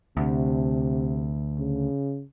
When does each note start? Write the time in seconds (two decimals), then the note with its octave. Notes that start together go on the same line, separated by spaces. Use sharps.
0.17 D2 C3
1.59 C#3